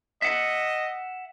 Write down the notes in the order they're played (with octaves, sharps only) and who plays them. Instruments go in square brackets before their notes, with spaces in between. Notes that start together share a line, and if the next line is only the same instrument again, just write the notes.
[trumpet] D#5 [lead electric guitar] E5 F#5